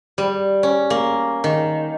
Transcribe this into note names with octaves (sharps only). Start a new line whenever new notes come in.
G3
C#4
A#3
D#3